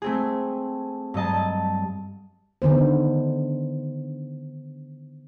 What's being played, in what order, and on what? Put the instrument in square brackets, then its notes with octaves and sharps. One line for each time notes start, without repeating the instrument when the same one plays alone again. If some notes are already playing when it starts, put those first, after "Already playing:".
[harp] A3 C4 G#4
G2 F#3 D#5 A5
[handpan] D3 D#3 B3 C5